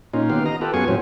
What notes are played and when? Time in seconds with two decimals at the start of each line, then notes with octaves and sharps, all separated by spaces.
0.14 A#2 C#4 D#4 F4
0.30 D#3 A#3 B3 G4 F5
0.46 D#5 A#5
0.61 F4 G4 A4 B4
0.74 F#2 B3 F4 G#4 G#5 C#6
0.88 F#2 A2 F#3 C4 C#4